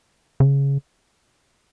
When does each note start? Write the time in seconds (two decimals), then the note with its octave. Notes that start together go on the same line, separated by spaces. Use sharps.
0.40 C#3